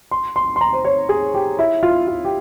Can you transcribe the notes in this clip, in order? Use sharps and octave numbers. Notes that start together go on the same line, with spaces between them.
C6
C6
C6
A#5
C5
C#5
G#4
G4
E4
F4
F4
G4